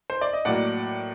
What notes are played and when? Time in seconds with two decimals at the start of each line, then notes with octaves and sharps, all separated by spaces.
0.10 C5
0.21 D5
0.33 D#5
0.45 A2 F#3 A#3 D5 F#5